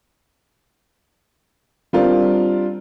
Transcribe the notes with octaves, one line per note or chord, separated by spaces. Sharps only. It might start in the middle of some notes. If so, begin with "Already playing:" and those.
G3 C4 D4 F4 A#4